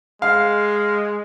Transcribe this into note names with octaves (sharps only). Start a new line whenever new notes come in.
G#3 F5